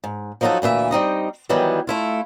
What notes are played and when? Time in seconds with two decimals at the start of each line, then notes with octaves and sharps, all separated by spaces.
0.04 G#2
0.41 F3 F#3 D#4 E4 F#4 A4
0.62 D2 A#2 E3 E5
0.91 G3 C4 D#4 D#5
1.49 D#3 E3 F#3 G3 B3
1.87 A3 E4 F4